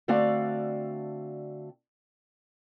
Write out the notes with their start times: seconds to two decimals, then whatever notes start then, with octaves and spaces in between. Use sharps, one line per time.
0.08 D3 A3 C4 F#4 D5 F5